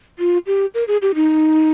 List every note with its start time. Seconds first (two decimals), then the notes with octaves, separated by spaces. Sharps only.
0.19 F4
0.46 G4
0.74 A#4
0.88 G#4
1.02 G4
1.15 D#4